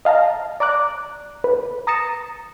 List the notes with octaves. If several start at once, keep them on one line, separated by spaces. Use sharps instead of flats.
D#5 F5 A5 A#5
D5 A#5 D6 F#6
B4
A#5 D#6 A6 A#6 C#7 E7